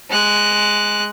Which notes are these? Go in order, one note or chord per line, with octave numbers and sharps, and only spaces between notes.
G#3 F#6